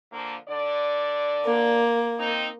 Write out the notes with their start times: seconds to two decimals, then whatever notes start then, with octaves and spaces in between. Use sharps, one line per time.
0.12 D3 F3 A#3
0.49 D3 D5
1.45 A#3
2.19 C4 D#4